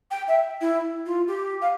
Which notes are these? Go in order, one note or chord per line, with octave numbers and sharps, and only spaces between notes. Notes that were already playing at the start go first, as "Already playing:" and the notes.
G5
E5
E4
F4
G4
F5